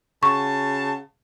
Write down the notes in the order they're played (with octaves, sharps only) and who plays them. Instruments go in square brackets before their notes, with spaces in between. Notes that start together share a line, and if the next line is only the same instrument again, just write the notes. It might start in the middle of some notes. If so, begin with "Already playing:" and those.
[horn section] C#3 F#4 A5 [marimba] C#6